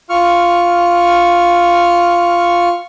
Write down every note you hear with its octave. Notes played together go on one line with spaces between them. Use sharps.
F4 C#6 F6